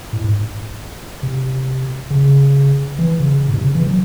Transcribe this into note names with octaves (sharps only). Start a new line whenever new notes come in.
A2
G#2
C3
C#3
E3
C#3
A2
C3
C#3
E3
F#3